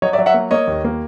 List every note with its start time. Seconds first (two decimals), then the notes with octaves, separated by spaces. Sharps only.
0.02 F#3 C#5 D#5
0.13 D5 E5
0.18 F#3
0.26 E5 F#5
0.34 A#3
0.51 A#3 C#5 D#5
0.67 D#2
0.84 A#3